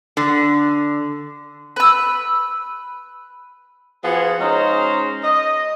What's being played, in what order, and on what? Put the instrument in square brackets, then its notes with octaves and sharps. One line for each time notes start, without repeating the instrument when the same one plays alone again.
[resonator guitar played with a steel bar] D3
[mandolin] B4 E6
[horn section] F3 B3 F#4 G#4
G#3 C#4 D#4 C5 A#5
D#5